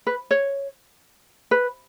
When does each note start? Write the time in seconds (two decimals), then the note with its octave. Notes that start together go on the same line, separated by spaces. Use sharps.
0.07 B4
0.31 C#5
1.51 B4